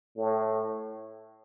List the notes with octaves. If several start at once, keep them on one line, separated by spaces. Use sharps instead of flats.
A2